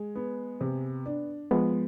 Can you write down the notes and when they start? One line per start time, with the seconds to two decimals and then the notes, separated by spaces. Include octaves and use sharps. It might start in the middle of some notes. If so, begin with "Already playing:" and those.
Already playing: G#3
0.15 B3
0.61 C3
1.06 D4
1.51 F3 G#3 B3